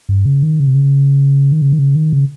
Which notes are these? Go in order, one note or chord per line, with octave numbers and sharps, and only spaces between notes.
G2
C#3
D#3
C#3
C3
C#3
D#3
C#3
D#3
C#3
D#3
C#3